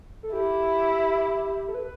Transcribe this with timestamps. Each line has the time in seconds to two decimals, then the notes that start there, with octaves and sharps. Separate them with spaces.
0.23 A4
0.33 E4 G4
1.68 A4
1.75 B4